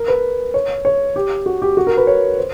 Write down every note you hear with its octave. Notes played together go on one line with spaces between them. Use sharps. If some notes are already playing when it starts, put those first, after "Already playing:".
Already playing: A#4
B4
C#5
C#5
G4
F#4
G4
F#4
A#4
B4
C#5
C5